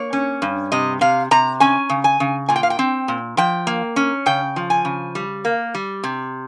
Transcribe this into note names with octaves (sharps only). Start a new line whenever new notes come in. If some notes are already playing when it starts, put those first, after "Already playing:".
Already playing: A#3 C#5
C#4
G2
C3 D#5
C3 F5
C3 A#5
C#4 G#5
C#3
G#5
C#3
A#2 G#5
G5
F5
G5
C4
A#2
F3 G5
A#3
C#4
C#3 G5
F3
G#5
C#3
G3
A#3
G3
C3